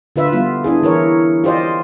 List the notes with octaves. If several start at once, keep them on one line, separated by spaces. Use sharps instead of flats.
D3 F4 B4 E5
G3 B3 F4
D4 E4 G#4
E3 E4 A#4 C#5
F4 G4 C5 D5 D#5